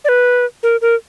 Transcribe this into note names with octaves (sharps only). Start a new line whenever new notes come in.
D5
B4
A#4
A#4